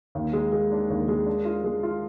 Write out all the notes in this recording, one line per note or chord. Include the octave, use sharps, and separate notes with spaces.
D#2
G#3
G#3
D4
D#2
G#3
D4
F4
G#3
F4